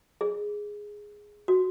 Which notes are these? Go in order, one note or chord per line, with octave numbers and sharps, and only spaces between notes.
G#4
F#4